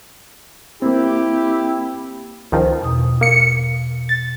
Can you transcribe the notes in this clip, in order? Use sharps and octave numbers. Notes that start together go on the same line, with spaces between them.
A#3 C4 E4 G4
C#2 D#3 F3
E2 B2 D#6
A#3 C#7
A6